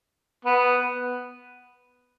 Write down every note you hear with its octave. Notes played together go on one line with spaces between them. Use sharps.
B3